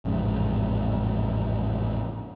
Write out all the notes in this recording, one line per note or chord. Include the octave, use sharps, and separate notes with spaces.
A1 F2 G#2 C#3